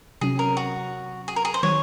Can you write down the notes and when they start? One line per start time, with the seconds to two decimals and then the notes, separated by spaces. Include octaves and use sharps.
0.21 C3 F#3 C#4 G#4
0.39 A#4
0.57 F#4
1.28 G#4
1.36 A#4
1.45 G#4
1.54 C5
1.63 D#3 F#3 C4 C#5